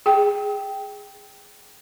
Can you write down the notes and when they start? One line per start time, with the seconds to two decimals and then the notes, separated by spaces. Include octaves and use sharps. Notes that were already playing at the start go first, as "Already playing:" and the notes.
0.06 G#4 G5